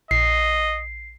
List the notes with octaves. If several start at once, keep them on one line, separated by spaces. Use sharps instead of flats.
A#1 D#5 C7